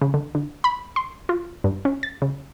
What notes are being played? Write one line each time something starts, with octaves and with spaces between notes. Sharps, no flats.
C#3
D3
D3
B5
C6
F4
G2
C#4
A6
C#3